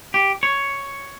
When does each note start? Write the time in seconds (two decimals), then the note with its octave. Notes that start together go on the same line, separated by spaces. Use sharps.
0.14 G4
0.43 C#5